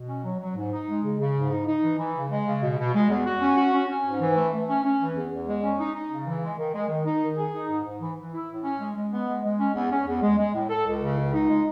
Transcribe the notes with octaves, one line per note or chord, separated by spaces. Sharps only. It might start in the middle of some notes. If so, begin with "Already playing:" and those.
Already playing: B2
C#4
F#3
F#3
G#2
D#4
G#3
C#3
C#3
G#2
D#4
D#4
E3
E3
C#3
G#3
C#3
B2
B2
G#3
E2
F#4
C#4
F#4
C#4
C#4
G#2
E3
A3
A3
C#4
C#4
E3
E2
E2
G#3
C#4
D#4
D#4
C#3
E3
G#3
D#3
G#3
D#3
D#4
D#3
G#4
D#4
G#2
G#2
E3
E3
E4
A2
C#4
G#3
G#3
B3
G#3
G#3
C#4
E2
C#4
E2
G#3
G#3
A2
A4
C#2
C#3
C#2
D#4
G#3